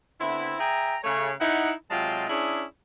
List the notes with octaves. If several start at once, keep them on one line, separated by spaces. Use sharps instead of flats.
D3 B3 C4 E4
G#4 E5 G5 A#5
C#3 A3 C#5
D#4 E4 F#5
C3 F#3 G#3 F4 G5 A5
C#4 D4 E4 G#4